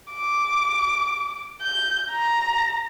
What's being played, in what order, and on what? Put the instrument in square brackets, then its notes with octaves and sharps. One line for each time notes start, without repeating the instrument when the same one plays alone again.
[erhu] D6
G6
A#5